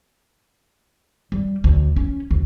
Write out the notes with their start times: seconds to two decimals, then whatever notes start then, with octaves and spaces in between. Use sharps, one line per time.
1.32 G3
1.64 D2
1.96 C#4
2.31 D2